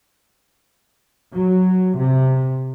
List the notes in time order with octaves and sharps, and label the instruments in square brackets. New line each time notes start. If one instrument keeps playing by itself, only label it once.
[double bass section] F#3
C3